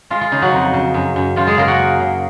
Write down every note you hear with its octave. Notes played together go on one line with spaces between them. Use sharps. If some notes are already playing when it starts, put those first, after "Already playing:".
G#3 F4
F4
C#3 D#4
F#3 F#4
F2
C#3
F#2
F#2
F#2 F4
G#3 G#4
C#3 A#3 A#4
F#4 F#5
A#3
C#3